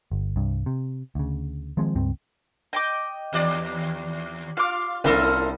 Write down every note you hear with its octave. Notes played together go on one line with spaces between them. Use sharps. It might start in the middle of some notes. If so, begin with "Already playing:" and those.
G1
C2 G2
C3
D2 C#3
D#3 F3 G#3 C4
C#2 G2 C4
D#5 G5 D6
D#2 G4 D5
F4 F5 D6
C2 C#4 E4 F4 A4 A#4